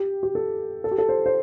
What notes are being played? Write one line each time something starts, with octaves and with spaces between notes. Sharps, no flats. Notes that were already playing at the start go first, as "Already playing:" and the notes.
Already playing: G4
G4
A4
A4
G4
A4
C5
C5